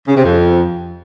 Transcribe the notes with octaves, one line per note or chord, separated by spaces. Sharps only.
C#3
C3
F2